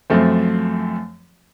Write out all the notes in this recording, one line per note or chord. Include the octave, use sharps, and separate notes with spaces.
F#2 F3 A3 C4